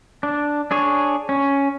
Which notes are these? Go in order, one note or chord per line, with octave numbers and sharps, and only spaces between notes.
D4
D4 G#4 C#5
C#4